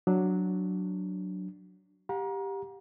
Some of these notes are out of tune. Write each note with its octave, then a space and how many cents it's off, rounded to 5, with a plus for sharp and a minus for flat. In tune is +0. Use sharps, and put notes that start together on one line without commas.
F#3 +0 D4 +0
G4 +5 F#5 -45 A#5 +30